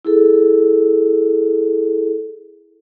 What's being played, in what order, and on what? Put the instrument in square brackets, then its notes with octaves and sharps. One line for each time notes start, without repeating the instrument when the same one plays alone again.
[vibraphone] E4 G#4 A4